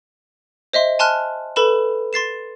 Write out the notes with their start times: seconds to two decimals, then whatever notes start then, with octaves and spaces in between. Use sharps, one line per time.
0.73 C5 D#5 E5 C6
0.99 G#5 A5 C6 F6 F#6
1.56 A4 B4 B5 E7
2.13 C6 A6 C7 E7